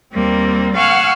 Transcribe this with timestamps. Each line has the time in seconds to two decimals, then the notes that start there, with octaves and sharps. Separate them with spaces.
0.13 D#2 G3 A#3 C4
0.76 F5 F#5 G#5 C#6 E6 F6